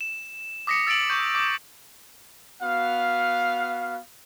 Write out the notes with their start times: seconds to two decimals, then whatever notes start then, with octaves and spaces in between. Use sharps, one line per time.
0.01 E7
0.67 D6 D#6 A#6 B6 C#7
0.87 E6 A6 C#7 D7 F#7
1.10 C#6 G6
1.35 D6
2.61 B3 F#4 F5